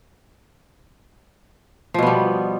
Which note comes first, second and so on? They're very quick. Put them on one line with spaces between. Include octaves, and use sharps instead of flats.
F3 B2 B3 G3